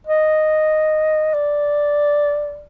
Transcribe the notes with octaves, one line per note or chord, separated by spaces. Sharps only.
D#5
D5